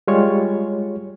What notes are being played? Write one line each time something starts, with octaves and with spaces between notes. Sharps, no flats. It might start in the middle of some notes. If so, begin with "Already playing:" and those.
G3 G#3 F4 C#5 C#6